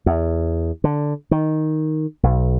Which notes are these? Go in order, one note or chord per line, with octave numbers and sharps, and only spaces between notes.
E2
D3
D#3
B1